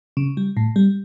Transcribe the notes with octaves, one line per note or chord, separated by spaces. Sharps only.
C#3
G3
A2
G3